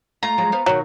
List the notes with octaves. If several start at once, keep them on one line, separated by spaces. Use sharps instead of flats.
A3 F4 A#5
F3 F#3 G#3
B3 C5 F5
B2 D#3 F#3